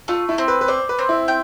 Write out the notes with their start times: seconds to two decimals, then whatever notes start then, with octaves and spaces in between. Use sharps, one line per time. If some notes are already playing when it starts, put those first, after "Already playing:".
0.08 A3 F4
0.29 E4
0.38 C4
0.48 B4
0.61 B4
0.68 C5 D5
0.89 B4
0.99 C4
1.09 E4
1.28 G5